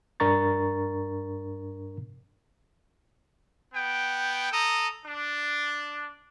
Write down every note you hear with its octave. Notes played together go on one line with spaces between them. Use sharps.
G2 D4 A#4 A#5 C#6 A6
B3 G5
A4 A#5 D#6
D4